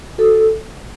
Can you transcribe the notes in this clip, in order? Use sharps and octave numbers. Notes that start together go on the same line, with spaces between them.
F#4 A4